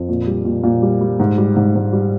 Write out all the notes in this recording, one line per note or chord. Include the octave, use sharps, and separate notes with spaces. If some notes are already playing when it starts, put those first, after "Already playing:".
Already playing: F2
A#2
G3
A#2
A#2
G3
G3
G#2
G3
G#2
G#2
G3